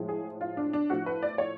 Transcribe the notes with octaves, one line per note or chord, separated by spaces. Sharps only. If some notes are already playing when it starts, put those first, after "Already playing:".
Already playing: A2 F3 G#3
G#4
F4
D4
D4
A2 F3 A3 F#4
B4
D5
C#5